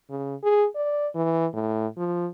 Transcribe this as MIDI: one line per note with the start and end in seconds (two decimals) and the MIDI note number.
0.10 0.35 49
0.43 0.66 68
0.76 1.07 74
1.15 1.47 52
1.53 1.87 45
1.98 2.28 53